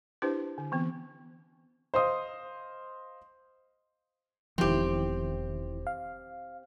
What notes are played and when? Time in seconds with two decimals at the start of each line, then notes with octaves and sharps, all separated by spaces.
0.22 D4 E4 G4 B4 C5
0.58 D3
0.72 E3 B3 C4
1.94 C5 D#5 F5 C6 D#6
4.58 E1 D#3 F3 C4 E4 G4
5.87 F5